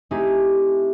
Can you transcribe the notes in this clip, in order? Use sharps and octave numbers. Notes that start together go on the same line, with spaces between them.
A3 C4 D#4 E4 G4 G#5